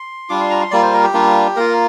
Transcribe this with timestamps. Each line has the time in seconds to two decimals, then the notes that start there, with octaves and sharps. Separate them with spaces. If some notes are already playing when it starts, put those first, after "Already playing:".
Already playing: C6
0.29 G3 D4 F4 D6
0.40 C6
0.50 A#5
0.61 C6
0.71 G3 A#3 F4 D5
0.82 C5
0.93 A#4
1.03 G4
1.14 G3 A#3 D4 F4
1.56 A#3 F4 A#4